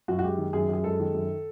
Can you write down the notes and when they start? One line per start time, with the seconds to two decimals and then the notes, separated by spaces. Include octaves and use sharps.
0.08 F#2 F#4
0.19 F#4
0.24 G#3 G4
0.38 D#3
0.53 F#2 G#4
0.69 F#2 G#4
0.84 G#3 A4
1.00 D#3
1.14 F#2